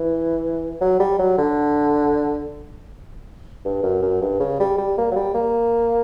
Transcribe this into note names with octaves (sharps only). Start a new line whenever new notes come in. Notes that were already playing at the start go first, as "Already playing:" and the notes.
Already playing: E3
F#3
G3
F#3
D3
G2
F#2
F#2
G2
C#3
G3
G3
A#3
F#3
G3
A#3